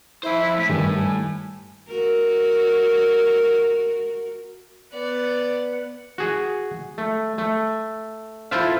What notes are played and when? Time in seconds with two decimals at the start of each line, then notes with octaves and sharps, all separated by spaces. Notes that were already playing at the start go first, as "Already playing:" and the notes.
0.23 F2 E4 C5
0.58 A2 B6
0.69 G2 D#3 G3 G#5
1.88 F#4 A#4
4.93 B3 D5 F#5
6.18 F#4 G#4
6.98 A3
7.38 A3
8.51 E4 F4 A4 C5 E5 F5